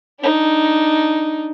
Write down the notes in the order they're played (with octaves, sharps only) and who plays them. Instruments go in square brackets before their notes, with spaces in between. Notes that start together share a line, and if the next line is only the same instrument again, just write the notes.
[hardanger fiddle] D4 D#4